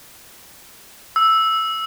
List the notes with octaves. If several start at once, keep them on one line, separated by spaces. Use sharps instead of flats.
E6